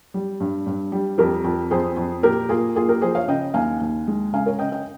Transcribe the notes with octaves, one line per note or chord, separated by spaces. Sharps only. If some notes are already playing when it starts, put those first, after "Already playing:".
G3
G2
G2
G3
F2 G4 A#4
F2
F2 G#4 C5
F2
A#2 G4 A#4
A#3 F4 G#4
A#3 F4 G#4
G4 A#4
F3 G#4 C5
C#5 F5
C#3 D#5 G5
D#2 F5 G#5
D#2
G#3
C#3 F5 G#5
A#4 C#5
C#3 D#5 G5
D#5 G5